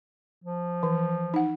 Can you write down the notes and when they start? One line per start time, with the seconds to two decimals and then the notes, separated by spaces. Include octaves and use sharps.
0.44 F3
0.83 E3
1.34 D#4 F#5